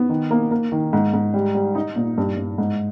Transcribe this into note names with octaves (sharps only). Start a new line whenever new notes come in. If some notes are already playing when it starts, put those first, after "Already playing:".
Already playing: B3
D#3
A#3
A#3
D#3
G#2
G#2
G3
G3
D#4
A#2
G2
G2
G#2